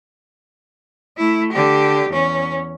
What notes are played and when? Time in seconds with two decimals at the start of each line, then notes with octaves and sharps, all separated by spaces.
1.17 A3 E4
1.53 D3 G4
2.10 E2 C#4